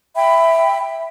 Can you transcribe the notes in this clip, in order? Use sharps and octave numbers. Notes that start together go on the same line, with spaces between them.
E5 G5 B5